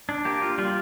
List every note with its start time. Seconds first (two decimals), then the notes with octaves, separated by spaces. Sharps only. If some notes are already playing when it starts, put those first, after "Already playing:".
0.09 D4
0.25 A#3 G4
0.42 F4
0.58 G3 F4